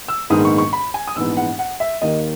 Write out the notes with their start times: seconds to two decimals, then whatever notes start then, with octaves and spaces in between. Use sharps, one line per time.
0.08 E6
0.30 A#1 G#2 D#3 G#3 B3 D#6
0.45 C#6
0.58 C#6
0.73 B5
0.94 G#5
1.08 D#6
1.15 A#1 G#2 E3 B3 E6
1.37 F#5
1.59 F#5
1.80 E5
2.01 D#2 D#3 A#3 D#5